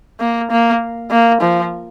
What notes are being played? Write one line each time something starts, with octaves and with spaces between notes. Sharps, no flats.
A#3
A#3
A#3
F3